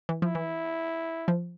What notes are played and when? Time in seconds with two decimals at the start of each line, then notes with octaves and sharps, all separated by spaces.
0.09 E3
0.22 F3 E4
0.35 E3
1.28 F3